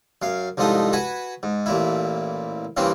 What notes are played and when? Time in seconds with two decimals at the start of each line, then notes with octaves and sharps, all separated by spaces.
0.22 F#2 F5
0.57 C2 G#2 F3 A3 D#4 D#6
0.93 F#4 B4 G#5
1.43 G#2
1.66 A1 A#2 E4
2.77 G2 C#3 E3 A#3 C4